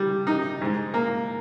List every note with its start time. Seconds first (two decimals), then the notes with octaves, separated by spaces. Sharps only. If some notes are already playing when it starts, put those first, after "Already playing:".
Already playing: G3
0.27 D#4
0.61 G#2
0.94 A#3